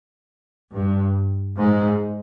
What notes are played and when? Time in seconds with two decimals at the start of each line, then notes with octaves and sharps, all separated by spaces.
0.73 G2
1.58 G#2